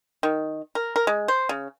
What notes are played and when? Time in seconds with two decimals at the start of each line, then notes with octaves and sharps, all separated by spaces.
0.23 D#3
0.75 A#4
0.96 A#4
1.07 G#3
1.28 C5
1.49 C#3